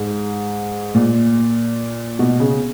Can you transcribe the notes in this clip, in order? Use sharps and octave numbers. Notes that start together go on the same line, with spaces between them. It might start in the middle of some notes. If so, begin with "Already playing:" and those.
Already playing: G#2
A#2
B2
C#3